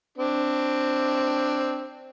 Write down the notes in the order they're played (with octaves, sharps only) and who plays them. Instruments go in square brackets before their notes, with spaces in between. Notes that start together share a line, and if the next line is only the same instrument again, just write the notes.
[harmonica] C4 D4